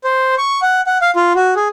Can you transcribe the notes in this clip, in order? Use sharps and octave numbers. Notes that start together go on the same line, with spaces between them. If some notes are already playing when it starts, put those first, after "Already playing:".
C5
C#6
F#5
F#5
F5
F4
F#4
G#4